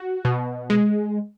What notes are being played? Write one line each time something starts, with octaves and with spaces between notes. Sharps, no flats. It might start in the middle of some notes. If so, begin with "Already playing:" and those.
Already playing: F#4
B2
G#3